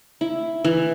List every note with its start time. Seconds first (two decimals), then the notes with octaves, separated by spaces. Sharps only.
0.21 E4
0.64 E3